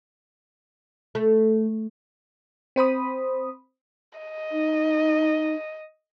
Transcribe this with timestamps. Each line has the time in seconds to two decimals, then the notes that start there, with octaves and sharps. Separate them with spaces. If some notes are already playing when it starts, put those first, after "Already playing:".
1.15 A3
2.76 C4 C5 B5 D#6
4.18 D#5
4.52 D#4